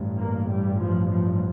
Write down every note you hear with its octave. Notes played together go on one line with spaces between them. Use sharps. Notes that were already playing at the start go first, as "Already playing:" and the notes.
Already playing: A1 G2
A#3
G3
F3
F3